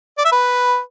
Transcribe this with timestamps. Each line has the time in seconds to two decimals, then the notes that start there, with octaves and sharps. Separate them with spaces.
0.18 D5
0.25 E5
0.32 B4